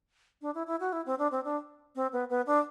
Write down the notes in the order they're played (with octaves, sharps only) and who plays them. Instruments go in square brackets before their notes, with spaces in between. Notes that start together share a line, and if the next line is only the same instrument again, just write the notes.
[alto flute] D4
E4
E4
F#4
E4
C4
D4
C4
D4
C4
B3
B3
D4